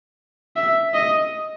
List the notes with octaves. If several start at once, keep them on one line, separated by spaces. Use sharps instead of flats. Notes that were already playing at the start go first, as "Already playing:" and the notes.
E5
D#5